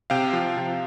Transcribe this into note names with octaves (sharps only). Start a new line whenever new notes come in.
C3 F5 G5
F3
C3